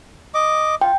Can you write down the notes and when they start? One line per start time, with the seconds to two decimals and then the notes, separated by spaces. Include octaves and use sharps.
0.34 D#5 D6
0.81 F4 G5